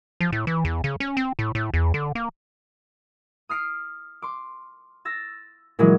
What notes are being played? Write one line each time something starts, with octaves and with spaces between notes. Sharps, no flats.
F3
A2
E3
E2
C#3
C#4
C4
A2
A2
E2
D3
A#3
D#6 F6 C7 D7
C6 D6
E6 A6 A#6
A#2 E3 F#3 G#3